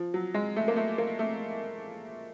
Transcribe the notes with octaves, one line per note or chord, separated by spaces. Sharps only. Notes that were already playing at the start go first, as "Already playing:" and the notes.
Already playing: F3
F#3
G#3
A3
A#3
A3
A#3
A3